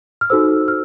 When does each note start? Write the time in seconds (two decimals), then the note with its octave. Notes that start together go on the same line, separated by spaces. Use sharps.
0.21 F6
0.30 D#4 F#4 A4 C5 E6
0.68 F6